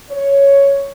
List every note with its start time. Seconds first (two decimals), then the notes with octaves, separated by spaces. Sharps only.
0.10 C#5